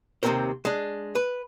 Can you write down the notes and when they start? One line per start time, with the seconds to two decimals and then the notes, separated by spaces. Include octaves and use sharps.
0.23 D#2 C3 F3 C4 A#4 C5
0.65 G#3 D4
1.15 B4